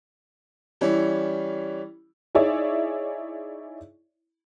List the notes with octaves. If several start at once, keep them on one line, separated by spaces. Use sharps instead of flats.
E3 G3 C#4 E4
D#4 E4 G#4 C#5 D5 E5